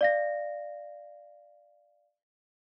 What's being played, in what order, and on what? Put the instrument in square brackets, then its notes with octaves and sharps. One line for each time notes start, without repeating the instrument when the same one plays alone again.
[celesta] D5 F5 A#6